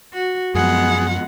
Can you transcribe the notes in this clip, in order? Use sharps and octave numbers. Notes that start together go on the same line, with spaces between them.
F#4
F#2 F3 G#3 B3 G#4 F#5